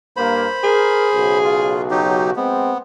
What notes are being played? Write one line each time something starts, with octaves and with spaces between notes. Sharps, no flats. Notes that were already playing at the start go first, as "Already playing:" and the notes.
G2 A#3 C5 B5
G#4 A#4
B1 C#3 F#4
F4
F#3 D#4 G4
G#3 B3 C4